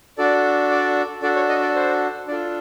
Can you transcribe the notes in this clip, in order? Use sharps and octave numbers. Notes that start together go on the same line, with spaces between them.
D4 F#4 A4 D5
D5
D4 F#4 A4 D5
C#5
D#5
D5
C5
D4 F4 A4 D5